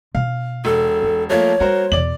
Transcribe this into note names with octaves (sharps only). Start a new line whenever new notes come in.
B2 D4 F5
E1 A4
F#3
F3 A3 A#3 C#5
G3 A#3 F#4 A#4 C5
E2 B2 D5 F#7